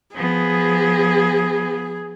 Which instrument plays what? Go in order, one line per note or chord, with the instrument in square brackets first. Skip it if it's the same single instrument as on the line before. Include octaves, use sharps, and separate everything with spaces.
[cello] F3 B3 [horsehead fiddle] G#4